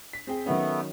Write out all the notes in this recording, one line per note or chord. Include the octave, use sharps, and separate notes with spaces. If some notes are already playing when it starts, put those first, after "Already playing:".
B6
C4 G#4 G5
D#3 F#3 A3 B3 C#4